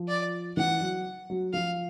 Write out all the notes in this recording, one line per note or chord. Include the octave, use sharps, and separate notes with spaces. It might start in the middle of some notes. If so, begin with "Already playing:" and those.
Already playing: F3
D5
E3 F#5
F#3
F#3
F3 F5